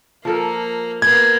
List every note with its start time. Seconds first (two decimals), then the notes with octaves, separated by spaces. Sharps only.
0.25 F3 A#3 A4 A#4
1.02 A#3 B3 B4 G#6